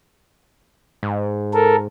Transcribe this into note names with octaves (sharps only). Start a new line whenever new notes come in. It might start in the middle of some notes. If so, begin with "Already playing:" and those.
G#2
A4 A#4